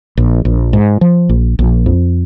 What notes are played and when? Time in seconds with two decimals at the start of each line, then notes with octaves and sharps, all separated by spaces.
0.17 A#1
0.45 A#1
0.73 G#2
1.01 F3
1.29 A#1
1.59 A#1
1.86 F2